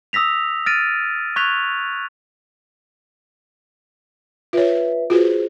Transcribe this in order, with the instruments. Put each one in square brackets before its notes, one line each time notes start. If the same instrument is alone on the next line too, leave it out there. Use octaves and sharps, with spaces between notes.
[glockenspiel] D#6 E6 A#6 B6 F7
F6 A6 A#6 D7 D#7
C#6 F#6 G#6 B6 F7
[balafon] F4 C#5 [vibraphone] B4 E5
[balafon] F4 F#4 B4 [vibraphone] G#4 C5